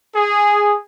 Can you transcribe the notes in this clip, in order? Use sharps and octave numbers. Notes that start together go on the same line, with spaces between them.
G#4